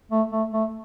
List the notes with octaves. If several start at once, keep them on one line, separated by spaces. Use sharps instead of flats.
A3
A3
A3